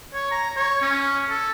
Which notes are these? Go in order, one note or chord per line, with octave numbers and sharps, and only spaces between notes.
C#5
A#5
C#5
C#4
A4